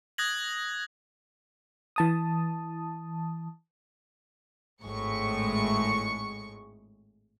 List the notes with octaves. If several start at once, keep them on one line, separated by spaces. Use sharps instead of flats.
D#6 F#6 G#6 A#6 F#7
E3 A5 D#6
G#1 A2 G#3 C#6 C#7